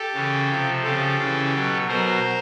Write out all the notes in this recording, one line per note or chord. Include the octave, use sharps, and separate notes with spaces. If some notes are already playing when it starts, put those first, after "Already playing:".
Already playing: G4 A4
C#3 E3
C3 F3
C#3 F3 G4 A4
C#3 E3
B2 F#3
B2 F#3 A#4 C5